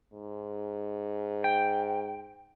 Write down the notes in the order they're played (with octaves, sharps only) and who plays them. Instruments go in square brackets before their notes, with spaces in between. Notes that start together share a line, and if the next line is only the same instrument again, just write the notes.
[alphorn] G#2
[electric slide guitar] G5